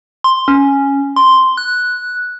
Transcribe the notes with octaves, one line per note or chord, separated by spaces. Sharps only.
C6
C#4
C6
F#6